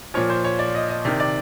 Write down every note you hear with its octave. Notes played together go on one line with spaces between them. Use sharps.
A#2 F3 C#5
C5
C#5
D5
D#5
D#5
C3 D#3 D5
D5